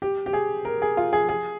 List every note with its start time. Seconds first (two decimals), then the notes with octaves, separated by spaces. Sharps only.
0.02 G4
0.26 G4
0.33 G#4
0.65 A#4
0.82 G#4
0.97 F4
1.13 G#4
1.29 G#4